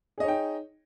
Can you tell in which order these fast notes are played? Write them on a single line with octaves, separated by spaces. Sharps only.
G#4 D#5 C#5 D#4 G5